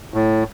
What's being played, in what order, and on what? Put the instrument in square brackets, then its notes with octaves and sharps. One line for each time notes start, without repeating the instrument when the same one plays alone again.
[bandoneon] A2